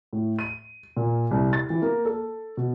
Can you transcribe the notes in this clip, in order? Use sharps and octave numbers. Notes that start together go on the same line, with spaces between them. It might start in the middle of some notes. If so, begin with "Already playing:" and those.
A2
D#7
A#2
C2
A6
E3
A#3
A4
B2